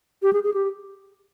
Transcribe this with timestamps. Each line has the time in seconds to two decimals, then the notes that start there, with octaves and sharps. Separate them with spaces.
0.23 G4
0.33 G#4
0.44 G#4
0.54 G4